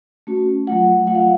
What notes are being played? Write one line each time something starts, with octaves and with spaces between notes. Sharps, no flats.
A3 C#4 F#4
F#3 A3 F4 F#5
F#3 A3 F4 F#5
F5